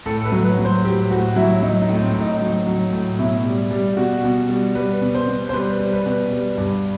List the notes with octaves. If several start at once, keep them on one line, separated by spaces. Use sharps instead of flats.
A2 A4
B4
F#3
B4
F#3
C5
A2 G4
A2 F#4
F#3 E4
F#3 D#4
D#4
A2
C4
A2
D#4
F#3
F#3
A2
B2 E4
G3
G3
B2 F#4
B2
G3
G3 B4
B2
C5
B2
C5
G3 B4
G3
B4
B2
G3
G2